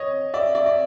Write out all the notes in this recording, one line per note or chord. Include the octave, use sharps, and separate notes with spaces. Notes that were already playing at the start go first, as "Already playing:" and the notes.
Already playing: C#5 D#5
D5 E5
D5 E5
D5